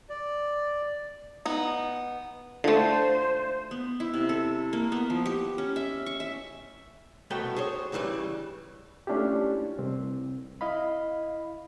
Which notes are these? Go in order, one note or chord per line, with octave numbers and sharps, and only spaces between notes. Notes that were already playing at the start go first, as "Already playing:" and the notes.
D5
B3 D#4
D3 A3 F4 C5 A5
B3
E4
C3
A4
A#3
B3
F3
G4
C#4
E5
C#6
E5
C2 B2 A3 B3 G5
G#4 C5 C#5
G2 C#3 E3 G3 B4
A3 C#4 D4 E4 F4 G4
C2 C4
E4 D#5 F5 B5